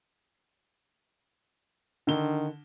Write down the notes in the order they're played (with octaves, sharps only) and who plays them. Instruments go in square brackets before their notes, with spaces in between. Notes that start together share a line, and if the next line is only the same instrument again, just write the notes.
[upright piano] D3 G7 [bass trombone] D#3